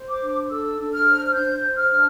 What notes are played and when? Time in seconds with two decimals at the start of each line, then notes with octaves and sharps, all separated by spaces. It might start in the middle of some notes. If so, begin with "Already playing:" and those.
Already playing: C5
0.08 D6
0.22 D4
0.50 A4 E6
0.78 D4
0.92 F6
1.07 C5
1.26 F6
1.34 D4 G6
1.63 C5
1.76 F6
1.91 D4